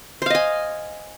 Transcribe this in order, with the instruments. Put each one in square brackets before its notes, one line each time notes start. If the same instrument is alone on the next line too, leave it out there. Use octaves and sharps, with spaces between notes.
[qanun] C5
F5
D#5
G#5